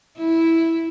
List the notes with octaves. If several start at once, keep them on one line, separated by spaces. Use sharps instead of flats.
E4